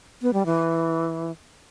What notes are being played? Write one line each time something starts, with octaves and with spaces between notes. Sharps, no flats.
B3
G3
E3